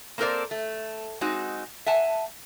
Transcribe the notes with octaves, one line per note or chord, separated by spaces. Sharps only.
A#3 C4 A4 A#4 C5 D5
A3
G#3 C4 D#4 F#4
E5 F#5 G#5 A5